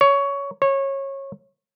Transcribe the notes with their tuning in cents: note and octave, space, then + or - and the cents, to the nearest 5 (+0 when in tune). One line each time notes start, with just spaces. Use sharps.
C#5 +15
C#5 -20